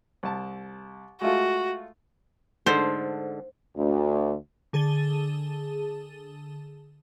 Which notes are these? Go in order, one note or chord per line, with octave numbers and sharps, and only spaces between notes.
C2 A5
G#3 A3 F4 F#4
G#2 D3 A4 C5
D2
D3 G#4 A5 A6 D#7 G7